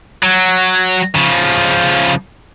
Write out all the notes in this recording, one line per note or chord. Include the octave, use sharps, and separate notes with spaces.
F#3
C#3 F3